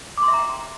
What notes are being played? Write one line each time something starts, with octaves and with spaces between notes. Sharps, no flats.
D6
C6
E5
A#5
G5